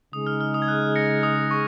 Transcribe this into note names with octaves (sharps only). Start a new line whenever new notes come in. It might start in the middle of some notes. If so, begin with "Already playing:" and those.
C#3 G#3 D#4 G#4 D#6
F6
F6
D#6
G#6
F#6
A#6 C#7
D#6
C#6